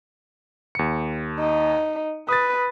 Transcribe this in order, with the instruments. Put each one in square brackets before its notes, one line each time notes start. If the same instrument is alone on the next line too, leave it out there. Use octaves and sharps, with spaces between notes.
[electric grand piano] D#2 C#7
[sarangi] D#4
[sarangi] B4 [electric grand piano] D#6 A6